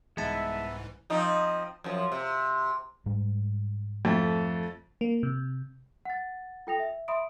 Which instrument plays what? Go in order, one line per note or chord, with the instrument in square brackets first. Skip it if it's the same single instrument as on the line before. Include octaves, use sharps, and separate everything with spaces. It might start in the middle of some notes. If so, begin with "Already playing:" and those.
[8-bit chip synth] C2 G#2 E3 [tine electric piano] G#3 A5 [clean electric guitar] B3 [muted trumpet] E5
[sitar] F3 C4 D#4
F#2 F3
C3
[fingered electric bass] G#2 G3 G#3
[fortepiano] F2 A3
[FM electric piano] A#3
C3
[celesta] F#5 A6
F4 A4 G5 D#6 A#6 F7
E5
E5 B5 C6 D#6 D7